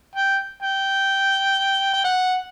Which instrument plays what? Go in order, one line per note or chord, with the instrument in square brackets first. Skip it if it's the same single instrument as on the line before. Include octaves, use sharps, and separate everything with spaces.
[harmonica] G5
G5
G5
F#5